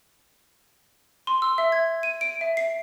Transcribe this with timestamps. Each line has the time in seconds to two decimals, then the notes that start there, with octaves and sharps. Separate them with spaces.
1.27 C6
1.42 E6
1.58 E5
1.72 G#6
2.03 D#7
2.21 D7
2.41 E5
2.57 C7